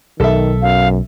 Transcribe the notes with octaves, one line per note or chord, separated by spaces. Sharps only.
B1 D#3 A4 E5
F#2 F5